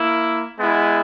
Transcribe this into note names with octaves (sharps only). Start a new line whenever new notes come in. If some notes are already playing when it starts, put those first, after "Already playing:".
Already playing: A#3 E4
G#3 B3 E4